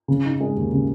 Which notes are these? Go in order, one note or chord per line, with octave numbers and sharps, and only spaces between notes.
C#3
D#4
G#3
D#2
C#3